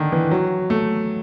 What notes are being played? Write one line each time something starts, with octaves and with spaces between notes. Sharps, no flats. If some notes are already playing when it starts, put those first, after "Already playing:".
Already playing: D3 D#3
E3
F#3
A3